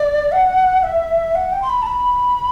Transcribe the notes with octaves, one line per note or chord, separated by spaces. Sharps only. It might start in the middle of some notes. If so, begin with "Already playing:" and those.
Already playing: D5
F#5
E5
F#5
G5
C6
B5
A5
B5